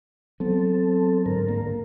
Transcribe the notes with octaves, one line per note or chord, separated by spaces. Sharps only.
F#3 B3 C4 A4
G#2 D3 A#4
A#3